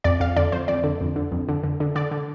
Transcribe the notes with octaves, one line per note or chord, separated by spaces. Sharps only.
F2 D5
F2 F5
D3 D5
F2 C5
F2 D5
D3
F2
D3
F2
D3
D3
D3
D3 D5
D3